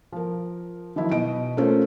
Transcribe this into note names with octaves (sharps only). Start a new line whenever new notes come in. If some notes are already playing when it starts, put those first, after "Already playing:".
F3 A#4
D#3 F3 F#3 E4
B2 D#5 D7
A3 A#3 C#4 F4 C5